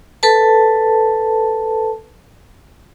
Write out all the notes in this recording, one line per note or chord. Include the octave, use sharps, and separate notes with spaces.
A4 B4 A5